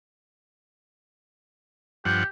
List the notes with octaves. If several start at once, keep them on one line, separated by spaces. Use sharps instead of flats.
G2 F3 G4 F#5